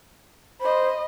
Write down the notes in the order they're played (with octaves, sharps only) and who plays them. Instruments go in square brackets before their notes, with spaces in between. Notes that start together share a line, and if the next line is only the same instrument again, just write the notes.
[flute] C5 [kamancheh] D#5 B5